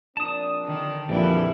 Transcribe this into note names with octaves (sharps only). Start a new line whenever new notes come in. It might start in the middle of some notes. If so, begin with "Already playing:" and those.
A#1 C4 D4 A5 D#6
D3 D#3
A#1 F2 D3 E3 G3 D4 E4